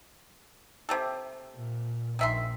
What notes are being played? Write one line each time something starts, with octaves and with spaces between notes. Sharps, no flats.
C3 G4 A4
A#2
A#1 D#3 E5 C6